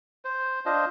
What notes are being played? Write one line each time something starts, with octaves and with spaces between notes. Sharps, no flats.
C5
D4 F4 C5 D#5